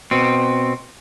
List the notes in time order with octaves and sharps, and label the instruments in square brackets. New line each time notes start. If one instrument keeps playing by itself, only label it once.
[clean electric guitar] B2 C4